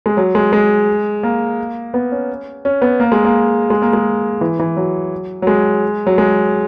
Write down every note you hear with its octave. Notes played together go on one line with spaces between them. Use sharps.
G#3
F#3
G#3
G#3
A#3
B3
C#4
C#4
B3
A#3
G#3
A#3
G#3
A#3
G#3
E3
E3
F#3
F#3
G#3
F#3
G#3